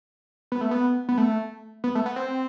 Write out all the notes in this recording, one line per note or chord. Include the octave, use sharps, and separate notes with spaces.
B3
A3
B3
B3
A3
B3
A3
B3
C4